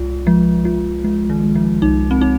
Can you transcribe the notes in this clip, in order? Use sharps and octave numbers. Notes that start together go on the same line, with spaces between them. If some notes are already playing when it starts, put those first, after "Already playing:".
Already playing: C2 G#3 F4
F3 G#3
F3 F4
F3 G#3
D#3
G#3
F3
C2 D#4
C4
D#4